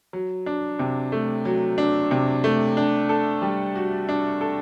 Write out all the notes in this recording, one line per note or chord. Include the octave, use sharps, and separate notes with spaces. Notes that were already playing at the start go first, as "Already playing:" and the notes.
F#3
D4
C3
A3
F#3
D4
C3
A3
D4
A4
G3
F#4
D4
A4